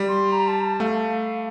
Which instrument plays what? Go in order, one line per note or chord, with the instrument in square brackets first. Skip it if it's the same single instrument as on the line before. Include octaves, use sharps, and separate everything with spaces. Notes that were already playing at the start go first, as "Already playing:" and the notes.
Already playing: [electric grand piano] G3
[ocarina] C6
A#5
A5
A#5
A5
[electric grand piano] A3 [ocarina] F5